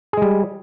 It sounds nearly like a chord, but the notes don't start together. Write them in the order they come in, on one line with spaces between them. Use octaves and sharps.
G#4 G#3 G3